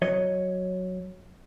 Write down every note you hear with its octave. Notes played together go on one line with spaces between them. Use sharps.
F#3 C#5 D#5